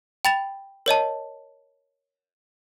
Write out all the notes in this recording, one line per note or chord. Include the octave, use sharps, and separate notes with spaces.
G5 B5 A6 E7 F7
A#4 C#5 D#5 A5